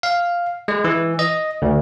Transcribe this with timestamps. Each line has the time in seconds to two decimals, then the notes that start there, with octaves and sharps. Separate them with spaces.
0.03 F5
0.68 G#3
0.84 E3
1.19 D#5
1.62 D2